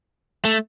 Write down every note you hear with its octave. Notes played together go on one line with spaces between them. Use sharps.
A3